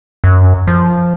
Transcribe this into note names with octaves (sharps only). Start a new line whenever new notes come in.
F#2
F3